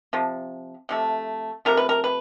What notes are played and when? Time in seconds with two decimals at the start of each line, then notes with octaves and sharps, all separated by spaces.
0.13 C3 F3
0.89 C3 F3 A3
1.65 C3 F3 A3 A#4
1.77 B4
1.89 A#4
2.04 B4